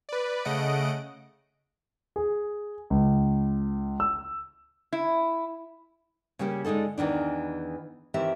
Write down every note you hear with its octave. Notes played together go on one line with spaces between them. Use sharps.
B4 D5
C#3 A3 D#5 F#5 D7
G#4
C#2
E6
E4
C#3 G3 A#3 C#4 G4
D3 G#3 D#4 G#4 A4
E2 D#3 E3 D4
D#3 E3 C4 G4 E5